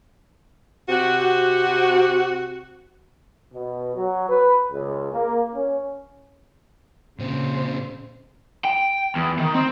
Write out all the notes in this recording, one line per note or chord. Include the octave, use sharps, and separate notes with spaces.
C3 F#4
B2
F#3
B4
C#2
A#3
C#4
A#2 C#3 C4 C5
G5
E2
D#3
C4